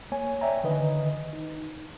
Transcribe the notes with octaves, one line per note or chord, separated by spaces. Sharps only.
A#3 C#5 G#5
C#5 D5 E5 G5 G#5 A#5
D3 D#3 B4 D#5
D#4